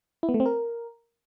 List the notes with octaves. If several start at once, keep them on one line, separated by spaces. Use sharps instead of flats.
E4
B3
A3
C4
A#4